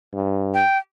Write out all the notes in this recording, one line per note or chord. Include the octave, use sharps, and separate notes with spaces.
G2
G5